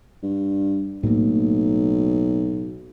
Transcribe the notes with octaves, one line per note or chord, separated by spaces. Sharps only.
G2
B1 A2 A3 A#3